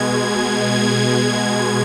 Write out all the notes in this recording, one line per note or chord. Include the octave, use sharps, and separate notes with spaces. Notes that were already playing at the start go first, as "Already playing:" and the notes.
Already playing: B2 G#3 G#6
G#6